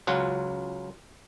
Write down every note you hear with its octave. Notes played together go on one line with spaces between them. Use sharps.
C#2 F#3 F4 F#5